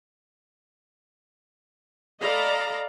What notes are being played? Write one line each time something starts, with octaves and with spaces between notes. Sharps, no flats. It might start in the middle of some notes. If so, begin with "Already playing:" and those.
A4 D5 D#5 F5 A#5 B5